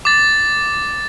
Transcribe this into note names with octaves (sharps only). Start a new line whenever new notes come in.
D6 A6